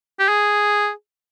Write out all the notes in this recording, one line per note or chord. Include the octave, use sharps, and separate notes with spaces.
G4
G#4